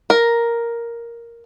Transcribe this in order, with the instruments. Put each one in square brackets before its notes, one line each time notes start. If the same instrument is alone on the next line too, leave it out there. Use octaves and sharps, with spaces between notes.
[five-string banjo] A#4